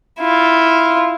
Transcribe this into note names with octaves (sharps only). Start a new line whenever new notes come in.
E4 F4